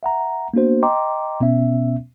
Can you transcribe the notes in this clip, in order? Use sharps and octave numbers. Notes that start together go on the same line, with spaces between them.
E5 F#5 A#5
A#3 B3 D4 F#4 C5
D#5 G5 A#5 C6 D6
B2 B3 C#4 E5